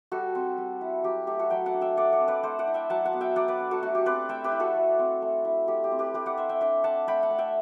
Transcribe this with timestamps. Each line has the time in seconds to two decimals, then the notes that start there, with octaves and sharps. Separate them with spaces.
0.12 G3 F#4 A4
0.35 C4
0.57 G3
0.81 E4
1.04 F#3 G4
1.27 A3 G4
1.39 F#4 A4
1.50 F#3 E5 G5
1.66 F#5 A5
1.73 D4
1.81 E5 G5
1.97 A3 D5 F#5
2.12 D5 F#5
2.20 C4
2.28 B4 D5
2.43 A3 A4 C5
2.59 D5 F#5
2.67 E4
2.74 E5 G5
2.90 F#3 F#5 A5
3.05 F#5 A5
3.13 B3
3.21 E5 G5
3.36 F#3 D5 F#5
3.48 B4 D5
3.60 D4
3.71 F#4 A4
3.82 A3 F#4
3.95 G4
4.06 C4 B4 D5
4.29 A3 E5 G5
4.44 G4 B4
4.52 E4
4.60 F#4 A4
4.75 A3
4.99 C4
5.22 A3
5.45 E4
5.68 A3 G4
5.84 G4
5.92 C4
5.99 G4 B4
6.14 A3 G4 B4
6.26 D5 F#5
6.37 E4 C5 E5
6.49 E5 G5
6.61 D4 E5 G5
6.84 D4 F#5 A5
7.07 A3 G5 B5
7.23 F#5 A5
7.30 A3
7.38 E5 G5